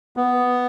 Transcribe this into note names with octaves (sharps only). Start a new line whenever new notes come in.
B3